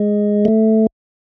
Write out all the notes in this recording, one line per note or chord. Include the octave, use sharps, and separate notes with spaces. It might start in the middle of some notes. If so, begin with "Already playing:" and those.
Already playing: G#3
A3